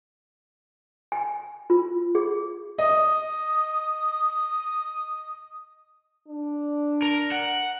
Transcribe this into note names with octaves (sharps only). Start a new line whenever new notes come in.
G#5
F4
G#4
D#5 D#6
D4
A#4
F#5